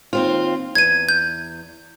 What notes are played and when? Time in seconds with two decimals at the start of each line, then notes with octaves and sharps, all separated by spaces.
0.13 D#2 C4 F4
0.75 E2 G#6 D#7
1.09 G6